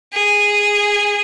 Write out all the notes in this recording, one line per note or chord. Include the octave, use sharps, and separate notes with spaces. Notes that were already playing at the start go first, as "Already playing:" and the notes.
G#4